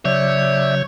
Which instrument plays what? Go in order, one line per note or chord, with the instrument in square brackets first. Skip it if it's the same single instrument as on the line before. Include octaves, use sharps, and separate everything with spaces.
[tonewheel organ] C#3 F#3 G6 [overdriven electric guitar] C#5 [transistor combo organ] D5 E5